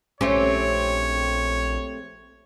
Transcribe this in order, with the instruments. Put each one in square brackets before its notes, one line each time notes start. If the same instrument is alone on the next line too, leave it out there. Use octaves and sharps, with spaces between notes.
[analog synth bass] A#1 [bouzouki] A3 C4 G4 [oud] C#4 [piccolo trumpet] C#5